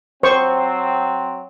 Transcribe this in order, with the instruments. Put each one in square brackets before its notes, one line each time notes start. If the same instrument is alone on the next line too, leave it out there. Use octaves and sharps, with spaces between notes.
[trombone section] F#3 C4 [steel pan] C5 C#6